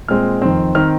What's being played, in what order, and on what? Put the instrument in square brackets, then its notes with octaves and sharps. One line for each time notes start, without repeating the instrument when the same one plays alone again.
[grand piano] A#2 G#3 C4 F6
F2 D#3 C4
D#3 C4 F6